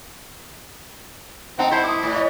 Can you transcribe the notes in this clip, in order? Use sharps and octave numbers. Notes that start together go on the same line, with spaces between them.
C4 D#4 F#5 A5
E4 C5 A5 C#7
D6 D#6
A2
C#5 D#5